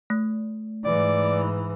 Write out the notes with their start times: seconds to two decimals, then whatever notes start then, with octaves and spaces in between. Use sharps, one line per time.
0.10 A3
0.85 G#2 E3 D5